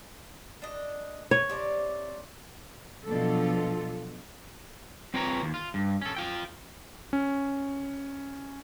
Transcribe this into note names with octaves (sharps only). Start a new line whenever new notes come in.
D4 D#5
C#5
C3 D5 A5
B2 F3 F#3 D4 F4 A4
C4 F4 B4 C#5 G5 A#5
D#2
F4
G2
C#4 A4
F4 G5
C#4